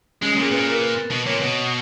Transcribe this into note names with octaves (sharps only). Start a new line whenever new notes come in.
G#3 C#4
C#4
A#2
G#4
A#2 B4
A#4
B4
B2
A#2 C#5
B2 B4